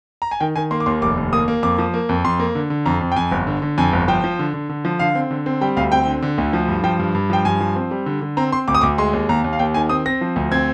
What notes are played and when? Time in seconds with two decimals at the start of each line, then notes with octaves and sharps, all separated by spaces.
0.22 A#5
0.31 G#5
0.40 D#3 G5
0.56 D#3 G#5
0.71 A#3 C6
0.80 D6
0.86 D#2 C6
1.02 F1 D6
1.17 D#2
1.32 A#3 D#6
1.48 A#3
1.63 F2 D6
1.78 F3
1.94 A#3
2.09 F2
2.25 F2 C6
2.39 A#3
2.55 D3
2.70 D3
2.86 F2 A#5
3.01 F2
3.12 G5
3.16 F2 G#5
3.31 G1
3.47 D3
3.62 D3
3.78 F2 G#5
3.93 G1
4.08 F3 G5
4.24 F3
4.39 D3
4.54 D3
4.69 D3
4.85 F3
4.99 D3 F5
5.15 C4
5.31 D3
5.46 C4
5.61 G3 G5
5.77 D2 F5
5.92 C4 G5
6.07 D3
6.22 D3
6.38 D2
6.53 F3
6.68 G2
6.83 F3 G5
6.99 G2
7.15 G2
7.30 F3 G5
7.45 G2 G#5
7.60 F3
7.76 C4
7.91 G3
8.06 D3
8.21 D3
8.37 C4 A#5
8.52 C4 C6
8.68 D2 D6
8.75 D#6
8.81 D2 D6
8.98 G#3 C6
9.13 D#2
9.29 D#2 A#5
9.44 D#2
9.53 F5
9.59 D#2 G5
9.74 D#3 G#5
9.89 C4 D#6
10.06 C4 A#6
10.21 F3
10.36 D2
10.52 C4 G#6